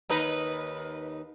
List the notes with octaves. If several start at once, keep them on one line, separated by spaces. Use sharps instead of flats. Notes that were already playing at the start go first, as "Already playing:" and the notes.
D#2 D#4 B4